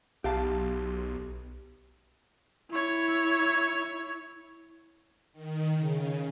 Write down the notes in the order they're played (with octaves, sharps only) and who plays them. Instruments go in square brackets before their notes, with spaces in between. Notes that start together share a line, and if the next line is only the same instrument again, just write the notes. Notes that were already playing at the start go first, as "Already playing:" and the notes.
[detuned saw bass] B1 [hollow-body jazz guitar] G4 F5 A5
[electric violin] E4 C#5
[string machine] D#3
C#3